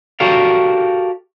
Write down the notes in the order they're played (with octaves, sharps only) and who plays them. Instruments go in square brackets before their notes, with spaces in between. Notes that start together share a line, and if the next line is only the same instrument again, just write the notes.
[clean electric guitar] F#4 G4 A4 A#4 D5 F5